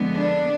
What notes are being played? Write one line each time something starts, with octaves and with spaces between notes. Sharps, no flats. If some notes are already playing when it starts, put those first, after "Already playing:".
Already playing: F2 D3 G#3 B3
D4